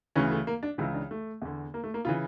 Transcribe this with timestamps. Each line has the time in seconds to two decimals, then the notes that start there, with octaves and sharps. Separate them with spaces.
0.15 D2 C#3 E3 C#4
0.31 A3
0.47 A#3
0.63 D4
0.78 C#2 C#3 E3 E4
0.94 D4
1.11 A3
1.42 E2 D3
1.74 A#3
1.84 A3
1.94 A#3
2.05 C#3 E3 F4